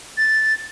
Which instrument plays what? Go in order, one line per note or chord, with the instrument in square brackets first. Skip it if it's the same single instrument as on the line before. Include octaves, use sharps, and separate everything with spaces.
[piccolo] A6